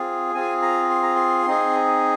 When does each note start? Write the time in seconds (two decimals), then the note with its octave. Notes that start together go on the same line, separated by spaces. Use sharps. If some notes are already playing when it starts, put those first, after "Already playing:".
Already playing: C4 F4 G#4
0.34 C4 F4 G#4 G#5
0.62 A#5
0.90 C6
1.02 A#5
1.15 C6
1.46 C4 D#4 G#4